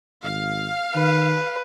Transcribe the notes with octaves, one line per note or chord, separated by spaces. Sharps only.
G#1 F5
D#3 B4